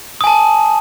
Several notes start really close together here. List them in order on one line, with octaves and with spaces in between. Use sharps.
D#6 G#5 A5